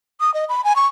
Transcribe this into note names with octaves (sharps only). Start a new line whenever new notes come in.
D#6
D#5
B5
G#5
C#6